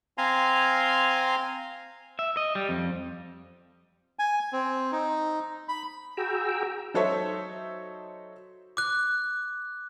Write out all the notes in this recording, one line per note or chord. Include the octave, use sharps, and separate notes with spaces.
C4 F5 G#5 A#5 C6
E5
D#5
G3
F2
G#5
C4
D#4
B5
F#4 G#4 G5 A#5 E6
F#3 D#4 A4 C5 C#5 E5
D6 F#6